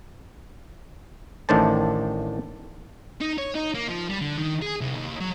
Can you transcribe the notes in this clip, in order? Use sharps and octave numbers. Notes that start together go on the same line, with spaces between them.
A1 A2 D#3 D4 C5 A5
D#4
C#5
D#4
A#3
F3
G3
D3
D#3
G#4
C2
D#2
F#3